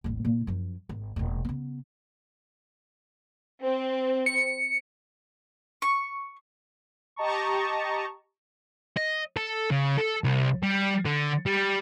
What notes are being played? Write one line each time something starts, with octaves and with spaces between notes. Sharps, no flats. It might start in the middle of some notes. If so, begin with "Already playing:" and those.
D#1 A1
A#2 E4
F#2 F3
G#1
E1 A#2
C#3 B3
C4
C#7
C#6
G4 D#5 A5 A#5 C#6
D#5
A4
C#3
A4
C2
G3
D3
G3